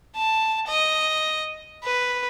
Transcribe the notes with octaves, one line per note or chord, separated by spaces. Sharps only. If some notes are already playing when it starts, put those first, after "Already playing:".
A5
D#5
B4